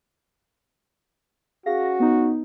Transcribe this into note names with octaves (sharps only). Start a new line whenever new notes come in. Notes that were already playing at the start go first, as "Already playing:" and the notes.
C#4 F#4 G#4 F5 A#6
B3 D#4